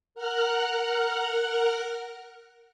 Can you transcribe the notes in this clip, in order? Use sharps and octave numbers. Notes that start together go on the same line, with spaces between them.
A#4 F#5 F6 F#6